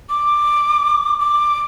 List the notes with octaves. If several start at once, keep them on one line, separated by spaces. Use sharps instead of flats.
D6
D6